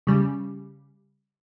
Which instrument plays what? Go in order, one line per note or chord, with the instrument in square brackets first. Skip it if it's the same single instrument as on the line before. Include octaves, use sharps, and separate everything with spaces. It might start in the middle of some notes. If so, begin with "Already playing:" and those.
[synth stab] C#3 G3